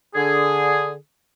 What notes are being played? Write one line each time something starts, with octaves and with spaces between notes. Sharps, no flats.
D3 G#4